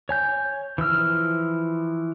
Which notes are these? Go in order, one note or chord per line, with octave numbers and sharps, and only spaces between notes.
C#5 G#5 G6
E3 F3 E6 F6